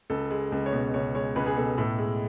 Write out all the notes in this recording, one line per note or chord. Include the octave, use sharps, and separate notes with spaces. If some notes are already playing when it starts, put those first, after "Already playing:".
C#2 A4
G#3
C#2
C#5
B2
C#2 C#5
G#3 C#5
C#2 B4
G#4
B2 A4
A2 A4
G#3